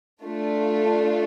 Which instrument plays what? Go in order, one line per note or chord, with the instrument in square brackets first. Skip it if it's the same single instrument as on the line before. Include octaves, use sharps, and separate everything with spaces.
[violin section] A3 D4 F4